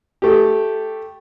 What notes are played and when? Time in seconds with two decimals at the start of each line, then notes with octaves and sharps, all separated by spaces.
0.22 A3 G4